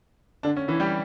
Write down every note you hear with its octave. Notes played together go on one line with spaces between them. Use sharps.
D3 D4
C#4
E3 E4
G3 G4